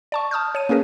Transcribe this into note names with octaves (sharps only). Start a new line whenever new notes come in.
D5 A5 C#6
A5 D#6 F6 G6
C#5 D#7
A#3 C#4 G#4 A#4 B4